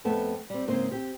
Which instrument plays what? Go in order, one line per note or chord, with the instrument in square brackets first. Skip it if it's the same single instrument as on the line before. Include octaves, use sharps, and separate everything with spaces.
[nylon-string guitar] F2 A3 B3 A5
G3 C4
G#2 C#3 A#3 C4 C5
C4 G4